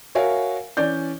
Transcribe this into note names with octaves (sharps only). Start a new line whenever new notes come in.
F#4 A#4 C#5 E5 F5 G#5
E3 C#4 D5 G6